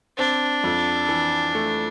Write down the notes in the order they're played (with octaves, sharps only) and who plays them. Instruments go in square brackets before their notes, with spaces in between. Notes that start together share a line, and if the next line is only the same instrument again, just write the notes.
[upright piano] C4 [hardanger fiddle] D4
[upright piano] F2
E3
A3